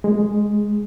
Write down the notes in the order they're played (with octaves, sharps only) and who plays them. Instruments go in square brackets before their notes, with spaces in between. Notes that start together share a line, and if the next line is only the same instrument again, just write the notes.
[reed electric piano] G#3